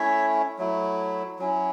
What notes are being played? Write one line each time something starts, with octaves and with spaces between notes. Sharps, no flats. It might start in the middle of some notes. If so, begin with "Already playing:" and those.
Already playing: A3 C#4 E4 C#5 E5
F#3 A3 E4
F#3 C#4 E4